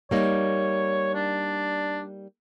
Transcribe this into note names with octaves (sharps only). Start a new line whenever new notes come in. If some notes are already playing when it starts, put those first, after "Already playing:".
G3 A#3 D#4 C#5
D4